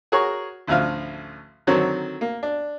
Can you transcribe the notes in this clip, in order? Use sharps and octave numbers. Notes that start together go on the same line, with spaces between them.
F#4 G#4 A#4 C#5 C#6
A1 D2 F3 F5
D3 D#3 F#3 C4 C#5
A#3
D4